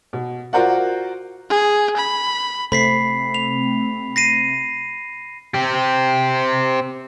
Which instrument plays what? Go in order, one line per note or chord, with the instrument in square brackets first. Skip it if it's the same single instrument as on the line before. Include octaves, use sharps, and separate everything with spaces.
[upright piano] B2
F4 F#4 A#4 C5 D5 F#5
[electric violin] G#4
B5
[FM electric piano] C3 A3 C4 [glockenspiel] B5 B6 C7
[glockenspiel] F7
A#6 C7 D#7
[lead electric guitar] C4 G4